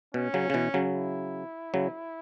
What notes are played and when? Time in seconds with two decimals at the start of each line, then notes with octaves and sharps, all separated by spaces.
0.14 B2 C#4
0.34 C#3 F#3
0.50 C#3
0.54 B2 E3
0.74 C#3 F#3
0.94 E4
1.74 C#3 F#3